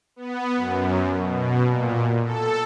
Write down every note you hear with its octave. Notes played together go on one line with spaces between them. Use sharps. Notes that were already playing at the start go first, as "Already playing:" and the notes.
B3
F#2
B2
A#2
A4